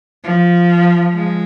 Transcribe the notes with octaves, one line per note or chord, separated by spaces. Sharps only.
F3
G#3